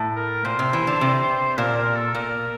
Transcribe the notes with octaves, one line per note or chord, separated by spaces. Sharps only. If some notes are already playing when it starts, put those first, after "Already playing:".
Already playing: A2
A#4
A#2 C5
C3
E3
D3
C3
A#2 A#4
A#4
A4
A#2 A#4